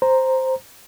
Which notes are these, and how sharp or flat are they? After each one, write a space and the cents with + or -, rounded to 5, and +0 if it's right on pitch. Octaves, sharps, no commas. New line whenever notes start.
C5 +0 A#5 +0